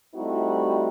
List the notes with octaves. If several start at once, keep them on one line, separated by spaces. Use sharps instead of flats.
G3 A3 C4 D#4 E4 F#4